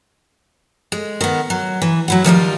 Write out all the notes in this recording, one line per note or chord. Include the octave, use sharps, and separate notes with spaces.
G#3
D#3 B3
F#3
E3
F#3 E4 F#5
D#3 F3 G3 F4